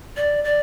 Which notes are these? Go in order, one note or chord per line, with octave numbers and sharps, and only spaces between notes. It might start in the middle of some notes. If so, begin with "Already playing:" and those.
D5
D5